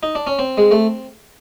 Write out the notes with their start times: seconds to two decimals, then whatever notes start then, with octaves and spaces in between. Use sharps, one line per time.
0.03 D#4
0.15 D4
0.27 C#4
0.39 C4
0.58 G#3
0.71 A3